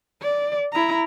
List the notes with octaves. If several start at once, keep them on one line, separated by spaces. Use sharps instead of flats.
D5
E4 A#5